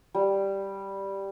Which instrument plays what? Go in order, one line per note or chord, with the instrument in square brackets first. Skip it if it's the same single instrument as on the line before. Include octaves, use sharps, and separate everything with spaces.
[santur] G3